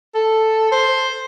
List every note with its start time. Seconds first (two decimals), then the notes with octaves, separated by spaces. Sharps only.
0.14 A4
0.72 C5